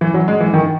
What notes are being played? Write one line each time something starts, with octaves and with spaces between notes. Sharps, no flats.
E3
F#3
G#3
E3
D#3